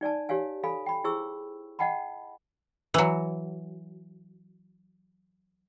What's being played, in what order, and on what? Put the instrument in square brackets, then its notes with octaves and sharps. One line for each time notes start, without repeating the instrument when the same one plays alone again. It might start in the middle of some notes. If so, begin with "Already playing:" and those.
[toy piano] D#4 D5 G#5 A5
G4 C#5 F5 G#5
A4 F5 G#5 B5
G5 B5
E4 G#4 C5 C#6 E6
D#5 F#5 G5 A5 B5
[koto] E3 F#3